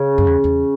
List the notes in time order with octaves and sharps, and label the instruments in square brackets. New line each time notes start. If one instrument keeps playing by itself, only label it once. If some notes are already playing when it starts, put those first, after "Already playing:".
Already playing: [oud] C#3
[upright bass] F#2
E2
E2